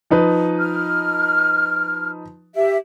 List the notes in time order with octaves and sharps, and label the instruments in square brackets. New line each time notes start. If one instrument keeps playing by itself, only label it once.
[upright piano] F3 D#4 B4
[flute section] F6
G4 E5